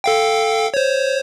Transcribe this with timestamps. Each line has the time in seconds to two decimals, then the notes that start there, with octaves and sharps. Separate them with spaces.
0.04 A4 F5 G5
0.74 C5 C#5